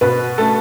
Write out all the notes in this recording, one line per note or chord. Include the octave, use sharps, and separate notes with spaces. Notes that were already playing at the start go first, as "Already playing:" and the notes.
B2 B4
A3 A4